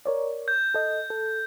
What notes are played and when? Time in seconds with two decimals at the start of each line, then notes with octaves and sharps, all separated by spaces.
0.06 A#4 C#5 D5
0.48 G6
0.74 A4 D#5
1.10 A4